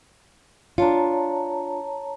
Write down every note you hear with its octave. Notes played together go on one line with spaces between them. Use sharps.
D4 F4 C#5 A5 A#5